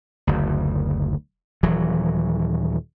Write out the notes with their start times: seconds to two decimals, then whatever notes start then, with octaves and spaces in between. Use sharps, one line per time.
0.27 F#1 D2
1.63 D#1 E3 F#3